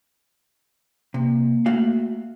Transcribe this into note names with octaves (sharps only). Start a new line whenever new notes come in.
C3 A#3
A3 F#4 F5